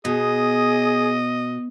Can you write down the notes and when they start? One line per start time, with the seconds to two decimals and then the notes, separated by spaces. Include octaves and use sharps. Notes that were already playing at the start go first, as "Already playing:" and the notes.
0.05 B2 G#4 D#5